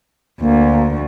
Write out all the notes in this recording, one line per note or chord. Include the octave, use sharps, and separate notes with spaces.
D2 A#3